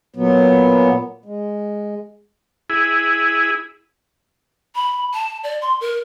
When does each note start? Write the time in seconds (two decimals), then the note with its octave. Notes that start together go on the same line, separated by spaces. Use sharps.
0.16 A#2 F#3 B3
1.25 G#3
2.70 E4 G#4
4.75 B5
5.14 A5
5.43 D5
5.61 C6
5.81 A#4